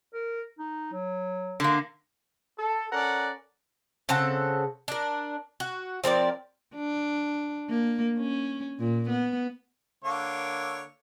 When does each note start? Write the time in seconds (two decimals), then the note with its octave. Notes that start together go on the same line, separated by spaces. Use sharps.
0.14 A#4
0.59 D#4
0.93 F#3
1.60 D3 A#3
2.59 A4
2.93 C#4 A4 A#4 D5 F#5
4.09 C#3 C4 A4 F#5
4.88 D4 A#4
5.60 F#4
6.04 F3 C4 A#4 D5
6.75 D4
7.69 A#3
8.19 C#4
8.79 A#2
9.09 B3
10.04 D3 A#3 C#5